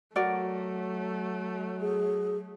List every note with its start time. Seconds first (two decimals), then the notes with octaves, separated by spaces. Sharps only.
0.16 F#3 A3 F#4 A#4 D5
1.81 G#4